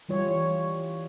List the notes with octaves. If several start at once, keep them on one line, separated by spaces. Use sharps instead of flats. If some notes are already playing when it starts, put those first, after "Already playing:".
E3 G3 F4 C#5